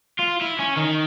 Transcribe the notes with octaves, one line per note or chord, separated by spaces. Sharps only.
F4
E4
C#4
D#3